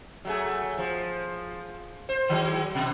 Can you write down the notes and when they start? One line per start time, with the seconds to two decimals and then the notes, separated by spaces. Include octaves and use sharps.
0.25 F#3 A3 G#4
0.78 F3
2.09 C5
2.29 D#3 F#3 G#3
2.75 B2